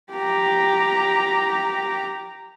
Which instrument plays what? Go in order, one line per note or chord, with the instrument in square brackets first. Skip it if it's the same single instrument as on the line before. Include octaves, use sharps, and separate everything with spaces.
[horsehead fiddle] G4 A#5